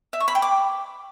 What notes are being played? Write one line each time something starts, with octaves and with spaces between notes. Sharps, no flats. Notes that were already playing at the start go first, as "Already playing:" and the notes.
E5
C#6
B5
G5
D6